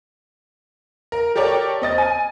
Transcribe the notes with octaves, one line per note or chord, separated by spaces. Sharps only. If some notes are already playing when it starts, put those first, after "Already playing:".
A#4
G4 A4 A#4 C#5 D5 G5
C4 D#5 A6
G#5